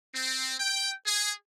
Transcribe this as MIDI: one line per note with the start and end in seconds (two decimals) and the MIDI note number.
0.13 0.52 60
0.58 0.91 79
1.05 1.31 68